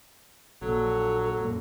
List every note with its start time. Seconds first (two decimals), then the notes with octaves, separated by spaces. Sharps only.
0.62 A#1 A#2 F#3 A4
1.40 F#2 A#2